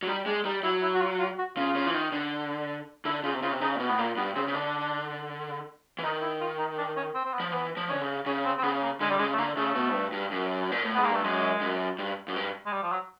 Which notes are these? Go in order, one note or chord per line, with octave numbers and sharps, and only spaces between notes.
F#3
G3 D#4
G#3 D4
G3 D#4
F#3 E4
E4
F#4
F4
F4
F#4
C#3 F4
C#3
E3
D#3
D3
D3 E4
C#3 F4
C3
C#3 F4
C3
C#3 D#4
A#2
B2
A2 B3
A#2 A#3
G2 B3
C#3 C4
C#3
D3 D4
E3
D#3 D#4
E4
F4
D#4
D4
C#4
C4
C4
B3
F3
E3 B3
F3
D3 C#4
C#3
C#3 C#4
C4
C4
C#3 B3
A#3
D3 G#3
G3
C#3 G#3
A3
D3 A#3
C#3 A3
B2
G#2
G2
G2
F#2
A#2
A2
G#2 B3
A#3
G2 A3
F#2 G#3
F#2
G2
F#2
G2
G#3
G3
F3
F#3